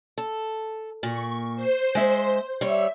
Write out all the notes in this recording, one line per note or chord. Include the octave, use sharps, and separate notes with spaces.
A4
A#2 C#6
C5
G#3 E5
G3 C#5 E5